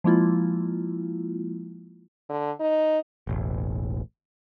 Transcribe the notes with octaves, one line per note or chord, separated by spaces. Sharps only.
F3 G#3 A#3 E4 F4
D3
D#4
E1 A1